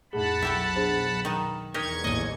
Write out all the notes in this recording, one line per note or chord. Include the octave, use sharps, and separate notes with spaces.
F2 A2 G#4 F#5 A5 B5
B1 E4 G4 A4
D4 G#4 C5
D#3 D#4
E2 D#4 G4 A#4 C#6 G#6
A1 D#2 D#5 G#5